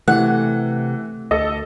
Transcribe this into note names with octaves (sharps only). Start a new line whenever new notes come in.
C3 E3 A3 F#5
D2 A4 D#5